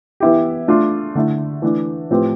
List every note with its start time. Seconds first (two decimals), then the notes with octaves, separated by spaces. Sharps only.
0.20 E3 B3 E4 G4
0.68 A3 D4 F4
1.15 D3 A3 E4
1.62 E3 A3 D4
2.10 A2 F3 C4 G4 B4